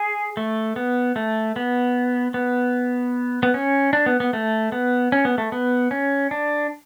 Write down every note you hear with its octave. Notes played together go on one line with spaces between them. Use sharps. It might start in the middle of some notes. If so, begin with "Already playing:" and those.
Already playing: G#4
A3
B3
A3
B3
B3
B3
C#4
D4
B3
B3
A3
B3
C#4
B3
A3
B3
C#4
D4